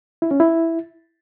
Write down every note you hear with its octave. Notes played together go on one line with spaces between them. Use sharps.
E4
C#4
E4